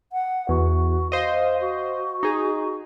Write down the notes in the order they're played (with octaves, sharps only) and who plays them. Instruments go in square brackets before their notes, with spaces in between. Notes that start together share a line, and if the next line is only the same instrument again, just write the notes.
[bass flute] F#5
[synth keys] E2 [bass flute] F#4
[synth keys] C5 D#5 [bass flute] F5
[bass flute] F#4
[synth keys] D#4 G#4